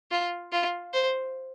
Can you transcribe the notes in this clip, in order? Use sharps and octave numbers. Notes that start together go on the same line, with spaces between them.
F4
F4
C5